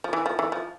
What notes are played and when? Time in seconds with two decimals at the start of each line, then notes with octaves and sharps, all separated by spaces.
0.04 F3
0.13 E3
0.26 F3
0.39 E3
0.52 F3